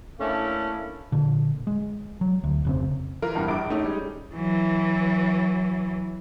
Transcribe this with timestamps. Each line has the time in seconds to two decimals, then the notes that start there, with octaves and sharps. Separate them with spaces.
0.19 A3 A#3 C#4 D4 E4
1.12 A#2 D3
1.67 G#3
2.21 F#3
2.44 D2
2.65 F1 C#3 C4
3.22 E3 F4 A#4
3.35 E2 G2 C3
3.48 A#1 D6 D7
3.70 A3 C#4 D#4
3.83 G3 G#3
4.35 E3 F#3